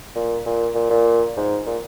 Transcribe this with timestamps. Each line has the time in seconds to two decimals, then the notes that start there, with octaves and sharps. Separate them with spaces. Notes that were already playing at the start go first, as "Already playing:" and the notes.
0.16 A#2
0.46 A#2
0.75 A#2
0.90 A#2
1.37 G#2
1.66 A#2